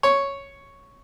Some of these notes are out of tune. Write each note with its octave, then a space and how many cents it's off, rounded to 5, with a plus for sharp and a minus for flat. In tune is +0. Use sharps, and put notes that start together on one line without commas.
C#5 +0